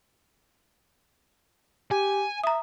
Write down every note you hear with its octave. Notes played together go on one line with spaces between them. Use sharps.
G4 G#5
E5 A#5 D#6